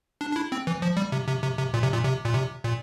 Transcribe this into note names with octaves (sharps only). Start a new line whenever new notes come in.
D4
D4
E4
C4
E3
F3
G3
C3
C3
C3
C3
A#2
C3
A#2
C3
A#2
C3
A#2